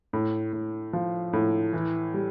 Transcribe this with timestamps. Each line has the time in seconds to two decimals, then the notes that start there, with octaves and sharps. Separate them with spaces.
0.13 A2
0.53 A2
0.93 F3
1.33 A2
1.73 E3
2.14 G3